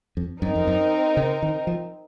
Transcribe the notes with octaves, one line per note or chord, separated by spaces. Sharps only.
F2
F#2 C4 D#4 A#4
F2
F#2
C#3
D#3
F3